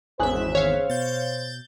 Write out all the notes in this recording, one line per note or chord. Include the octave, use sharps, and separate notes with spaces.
G#1 E2 C#4 G#4 C5 E5 F#6
C#5 F5
B2 G6 A6